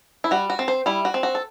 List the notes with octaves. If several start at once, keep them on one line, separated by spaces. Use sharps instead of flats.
E4
G3 F#4
F#4
C4
C5
G3 E4
F#4
C4
F#4
A4